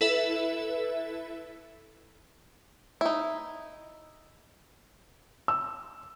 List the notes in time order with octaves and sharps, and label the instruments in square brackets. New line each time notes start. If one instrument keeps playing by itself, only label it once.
[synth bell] E4 A4 B4 E5
[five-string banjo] D#4 E4
[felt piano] E6